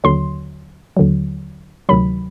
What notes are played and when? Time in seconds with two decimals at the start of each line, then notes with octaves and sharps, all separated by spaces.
0.04 D#2 D3 F#3 C6
0.97 D#2 D3 F#3
1.89 D2 C3 D#3 F#3 B5